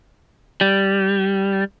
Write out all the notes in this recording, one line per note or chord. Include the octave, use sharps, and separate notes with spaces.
G3